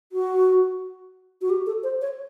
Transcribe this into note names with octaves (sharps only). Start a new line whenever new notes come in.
F#4
F#4
G4
A4
C5
C#5